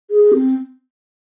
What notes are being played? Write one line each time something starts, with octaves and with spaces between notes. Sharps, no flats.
G#4
C4